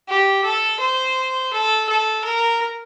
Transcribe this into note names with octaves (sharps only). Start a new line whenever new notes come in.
G4
A4
C5
A4
A4
A#4